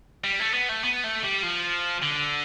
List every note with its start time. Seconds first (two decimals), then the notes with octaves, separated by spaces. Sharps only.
0.24 G3
0.40 A3
0.54 B3
0.69 A3
0.84 B3
1.04 A3
1.23 G3
1.43 F3
2.03 D3